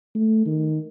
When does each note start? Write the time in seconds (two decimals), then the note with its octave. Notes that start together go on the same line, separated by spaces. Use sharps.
0.15 A3
0.46 D#3